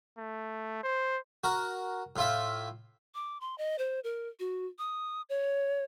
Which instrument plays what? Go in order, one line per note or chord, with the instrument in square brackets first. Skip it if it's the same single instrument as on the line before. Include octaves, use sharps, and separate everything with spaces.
[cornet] A3
C5
[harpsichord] F#4 A#4
A2 F4 E5
[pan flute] D6
C6
D#5
C5
A#4
F#4
D#6
C#5